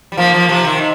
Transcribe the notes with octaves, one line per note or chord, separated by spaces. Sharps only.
G3
F3 A#3
F3 A#3
C3 F3
D#3
C3